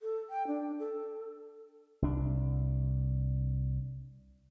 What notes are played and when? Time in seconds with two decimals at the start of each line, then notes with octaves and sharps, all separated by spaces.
0.01 A4
0.30 G5
0.47 D4
0.79 A4
2.02 C2 D4